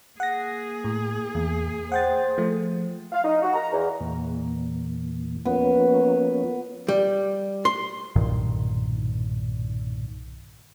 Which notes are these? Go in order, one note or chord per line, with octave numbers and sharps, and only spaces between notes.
A#3 G#4 F#5 A#6
A2
E2
C5 F#5 G5 A6
F3 A3
F5
D#4
F#4
A#5
E2
E2 A#2
F3 A#3 B3 C#4
G3
C6
B1 G2 A#2 D#3